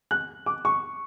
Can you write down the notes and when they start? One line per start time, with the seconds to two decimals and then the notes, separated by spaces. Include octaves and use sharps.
0.11 F#6
0.46 D6
0.65 C#6